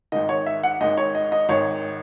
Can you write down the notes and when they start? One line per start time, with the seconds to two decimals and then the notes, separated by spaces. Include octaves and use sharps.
0.12 G#1 G#2 D#3 D#5
0.29 C#5
0.46 E5
0.63 F#5
0.81 G#1 G#2 D#3 D#5
0.98 C#5
1.15 D#5
1.32 D#5
1.49 G#1 G#2 D#3 C#5